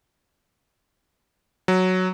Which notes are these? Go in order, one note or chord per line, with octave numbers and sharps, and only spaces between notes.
F#3